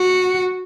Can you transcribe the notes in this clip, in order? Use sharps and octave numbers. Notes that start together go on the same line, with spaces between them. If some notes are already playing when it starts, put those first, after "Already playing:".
Already playing: F#4